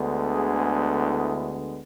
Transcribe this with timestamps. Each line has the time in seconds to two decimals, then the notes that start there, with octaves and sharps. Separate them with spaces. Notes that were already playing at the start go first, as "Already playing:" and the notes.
Already playing: D2 D3 G#3 B3
0.34 G#4
1.02 E4